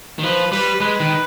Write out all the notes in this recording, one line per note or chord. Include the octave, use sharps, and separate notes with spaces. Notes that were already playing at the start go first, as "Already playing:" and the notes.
D#3
F3 B4
G3 B4
G#3 B4
D#3